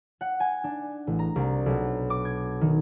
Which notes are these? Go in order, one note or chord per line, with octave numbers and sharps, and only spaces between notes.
F#5
G#5
D4
A1
A#5
C2
B1
D6
G#6
D#3